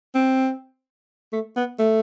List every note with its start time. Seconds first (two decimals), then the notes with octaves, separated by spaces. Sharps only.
0.15 C4
1.33 A3
1.56 B3
1.79 A3